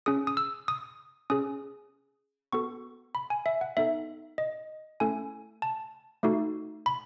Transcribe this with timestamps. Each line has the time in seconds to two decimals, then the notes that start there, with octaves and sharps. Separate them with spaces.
0.06 C#4 G#4 D#6
0.27 D#6
0.37 E6
0.68 D#6
1.30 C#4 G#4 D#6
2.53 B3 F#4 A4 C#6
3.15 B5
3.30 G#5
3.46 E5
3.61 F#5
3.77 B3 D#4 A4 E5
4.38 D#5
5.00 A3 C#4 E4 A4 G#5
5.62 A5
6.23 A3 D#4 F#4 A4
6.86 B5